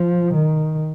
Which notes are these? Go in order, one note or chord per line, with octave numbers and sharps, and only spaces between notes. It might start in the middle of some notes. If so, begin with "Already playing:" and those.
Already playing: F3
D#3